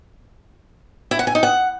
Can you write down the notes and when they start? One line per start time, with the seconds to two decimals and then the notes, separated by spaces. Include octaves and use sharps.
1.11 E4
1.19 F#5
1.27 G#5
1.35 D#4
1.43 F#5